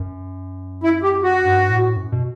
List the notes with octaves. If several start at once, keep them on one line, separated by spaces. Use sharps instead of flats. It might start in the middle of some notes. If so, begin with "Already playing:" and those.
Already playing: F#2
E4
G4
F#4
G2
A2
F#2
B2